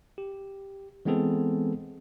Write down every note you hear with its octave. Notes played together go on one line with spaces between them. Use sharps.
G4
E3 G#3 B3 C4 G#4 A4